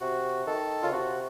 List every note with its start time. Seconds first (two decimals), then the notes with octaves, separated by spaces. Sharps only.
0.01 C3 F#4
0.46 D#3 A4
0.83 C#3 F4
0.92 C3 F#4